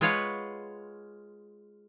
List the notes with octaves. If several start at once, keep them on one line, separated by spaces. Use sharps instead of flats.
G#3 F4 B4 C#5 F5 F#5